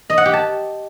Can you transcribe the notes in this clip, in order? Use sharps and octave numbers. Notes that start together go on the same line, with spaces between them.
D#5
F#5
G4
A5